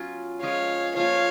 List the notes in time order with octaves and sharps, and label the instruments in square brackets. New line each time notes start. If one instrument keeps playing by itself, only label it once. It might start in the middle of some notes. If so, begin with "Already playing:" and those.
Already playing: [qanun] F#3 B3 C#4 F4
[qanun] F3 G#3 C#4 G#4 [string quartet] C#5 F5
[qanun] F3 A#3 C#4 F4 [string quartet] C#5 F5